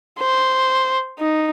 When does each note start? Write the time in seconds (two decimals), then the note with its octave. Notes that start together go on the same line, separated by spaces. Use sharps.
0.20 C5
1.20 D#4